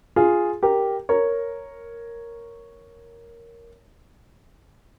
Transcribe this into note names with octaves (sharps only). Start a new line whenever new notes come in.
F4 G#4
G4 A#4
A#4 C#5